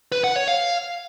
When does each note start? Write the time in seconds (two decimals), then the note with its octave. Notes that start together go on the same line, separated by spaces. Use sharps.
0.12 B4
0.24 F#5
0.36 C#5
0.48 F5